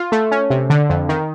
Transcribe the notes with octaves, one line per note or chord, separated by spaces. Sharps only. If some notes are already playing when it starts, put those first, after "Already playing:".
Already playing: F4
A3
C#4
C3
D3
F2
D#3